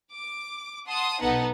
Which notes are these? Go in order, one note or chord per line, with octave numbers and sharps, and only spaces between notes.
D6
F#5 A5 C6 D#6
B1 B3 D#4 A4 F#5